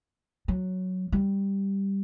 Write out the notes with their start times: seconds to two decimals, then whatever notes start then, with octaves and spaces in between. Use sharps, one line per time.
0.48 F#3
1.12 G3